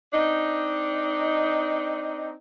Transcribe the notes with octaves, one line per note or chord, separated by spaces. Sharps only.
C4 D4 D#4